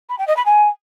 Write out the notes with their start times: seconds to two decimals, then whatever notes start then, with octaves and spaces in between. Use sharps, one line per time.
0.09 B5
0.18 G5
0.28 D#5
0.37 B5
0.46 G#5